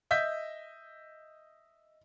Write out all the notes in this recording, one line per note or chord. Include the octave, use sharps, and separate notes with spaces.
D#5 E5 G6 B6